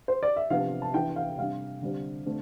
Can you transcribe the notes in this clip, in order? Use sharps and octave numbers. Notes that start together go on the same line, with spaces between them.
C5
D5
E5
C3 F3 B3 D4 F5
A5
E3 B3 D4 G5
F5
C3 G3 D4 F5
D3 G3 C4
D3 A3 C4